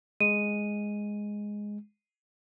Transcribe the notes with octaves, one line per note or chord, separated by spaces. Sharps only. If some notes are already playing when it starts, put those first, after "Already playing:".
G#3 D#7